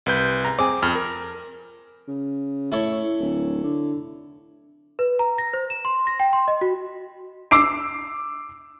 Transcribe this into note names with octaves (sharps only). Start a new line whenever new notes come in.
C2 B4 G6
A#5
C4 G#4 D6
F2 F6
A#4
C#3
A2 E4 A4 C#5
D1
D3
B4
A#5
A#6
C5
E7
C6
A#6
G5
C6
D#5
F#4
D6 E6 C7 D7